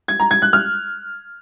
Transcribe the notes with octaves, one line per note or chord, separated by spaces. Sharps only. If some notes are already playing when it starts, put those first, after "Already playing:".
G#6
A#5
G#6
F#6
F6